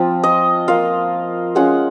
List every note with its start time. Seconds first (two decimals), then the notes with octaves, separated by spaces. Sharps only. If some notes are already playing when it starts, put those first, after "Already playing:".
Already playing: F3 C4 F4
0.24 D#5
0.68 A#3 F4 F5
1.55 G#3 C#4 F4 F#5